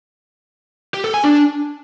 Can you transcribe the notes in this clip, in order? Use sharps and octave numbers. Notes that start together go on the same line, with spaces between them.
G4
A4
G#5
D4